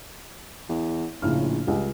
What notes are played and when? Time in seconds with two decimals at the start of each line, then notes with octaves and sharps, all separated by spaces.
0.69 E2
1.22 A#1 A2 C#3 F6
1.67 C#2 G3